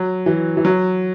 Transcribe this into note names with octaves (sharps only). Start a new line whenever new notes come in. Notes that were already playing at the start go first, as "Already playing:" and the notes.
Already playing: F#3
E3
E3
F#3